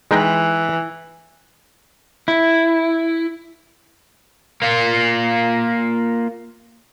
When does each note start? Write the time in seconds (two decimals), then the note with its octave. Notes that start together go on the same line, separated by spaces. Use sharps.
0.11 E3 G#3 D#4 G5
2.28 E4
4.62 A#3 F4